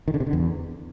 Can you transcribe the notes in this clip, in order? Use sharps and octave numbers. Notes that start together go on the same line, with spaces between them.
D#3
D3
C3
D3
E2